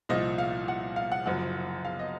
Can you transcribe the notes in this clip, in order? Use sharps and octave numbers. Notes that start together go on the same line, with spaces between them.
C2 A#2 F3 D#5
F5
F#5
F5
F#5
F#1 F#2 F3 F#5
F5
D#5